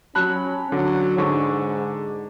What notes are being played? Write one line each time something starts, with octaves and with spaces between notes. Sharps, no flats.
F#3 C#4 A5 B5 F#6
D3 F#3
G#2 D3 D#4 C#6